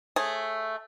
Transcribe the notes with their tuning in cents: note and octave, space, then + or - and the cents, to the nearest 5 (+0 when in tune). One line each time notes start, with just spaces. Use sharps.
A3 +0 G#4 +0 C#5 -35